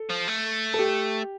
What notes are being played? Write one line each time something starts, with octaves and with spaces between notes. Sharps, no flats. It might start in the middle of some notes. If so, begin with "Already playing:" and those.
Already playing: A4
F3
A3
A4
G4